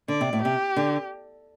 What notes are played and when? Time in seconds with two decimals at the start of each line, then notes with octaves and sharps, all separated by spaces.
0.08 D3 D5
0.21 C3
0.33 A2
0.43 C3 G4
0.76 D3